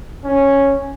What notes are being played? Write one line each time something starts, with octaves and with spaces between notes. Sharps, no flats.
C#4